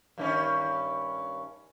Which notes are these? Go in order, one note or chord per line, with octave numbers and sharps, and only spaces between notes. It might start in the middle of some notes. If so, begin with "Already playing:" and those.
G2 D#3 C#4